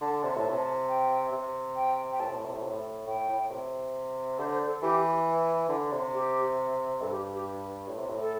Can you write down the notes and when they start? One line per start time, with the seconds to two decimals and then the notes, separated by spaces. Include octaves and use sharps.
0.01 D3 A5
0.20 C3 A5
0.36 A2 A5
0.50 C3
0.58 A5
0.89 G5
1.32 C3
1.76 G5
2.12 G5
2.20 A2 A5
2.29 C3
2.37 A2
2.45 C3
2.54 A2
2.63 C3
2.71 A2
3.07 A2 G5
3.29 A2
3.51 C3
4.39 D3 C5
4.53 C5
4.67 A4
4.82 E3 G4
5.69 D3
5.92 C3
6.13 G4
7.01 G2 A4
7.11 G4
7.34 G4
7.88 A2
7.98 C3
8.10 A2
8.21 A4